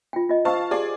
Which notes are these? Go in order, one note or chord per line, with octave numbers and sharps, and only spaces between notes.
F4 G5
F4 D#5
C5 F5 A5 C#6 E6
G4 G#4 D5